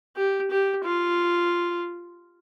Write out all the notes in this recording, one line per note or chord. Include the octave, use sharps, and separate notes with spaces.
G4
G4
F4